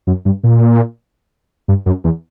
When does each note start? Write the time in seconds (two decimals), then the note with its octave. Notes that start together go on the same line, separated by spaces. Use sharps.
0.07 F#2
0.25 G2
0.44 A#2
1.68 G2
1.86 F#2
2.04 E2